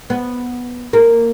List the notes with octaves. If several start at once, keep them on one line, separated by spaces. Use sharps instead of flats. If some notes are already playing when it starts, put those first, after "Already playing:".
B3
A#3